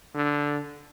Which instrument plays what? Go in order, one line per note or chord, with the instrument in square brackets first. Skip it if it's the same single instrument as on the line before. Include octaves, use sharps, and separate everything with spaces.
[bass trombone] D3